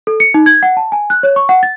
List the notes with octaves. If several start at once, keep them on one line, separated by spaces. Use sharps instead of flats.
A4
C#7
D#4
G#6
F#5
A5
G#5
F#6
C#5
C#6
F#5
A6